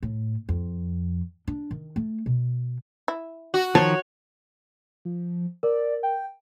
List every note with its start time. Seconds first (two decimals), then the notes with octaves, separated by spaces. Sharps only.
0.03 A2
0.49 F2
1.47 D4
1.71 D#3
1.96 A3
2.26 B2
3.08 E4
3.54 F#4
3.75 D#3 F3 C5 C#5 A5
5.05 F3
5.63 A#4 D5
6.03 G5